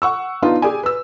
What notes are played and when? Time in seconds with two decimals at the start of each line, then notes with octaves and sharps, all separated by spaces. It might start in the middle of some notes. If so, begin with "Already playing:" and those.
0.02 F#5 C#6 E6
0.42 B3 D4 D#4 F4
0.62 G4 G#4 D5 G#5
0.83 B4 E6